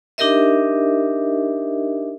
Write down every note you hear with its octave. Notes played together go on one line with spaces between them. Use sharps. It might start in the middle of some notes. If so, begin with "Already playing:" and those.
D4 D#4 G4 A#4 D#5 E5